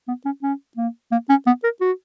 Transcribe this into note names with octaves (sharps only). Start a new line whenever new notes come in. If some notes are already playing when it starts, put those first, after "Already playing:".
B3
C#4
C#4
A#3
A#3
C#4
B3
A#4
F#4